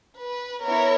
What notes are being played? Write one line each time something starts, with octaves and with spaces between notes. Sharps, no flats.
B4
B3 E4 A#4 C#5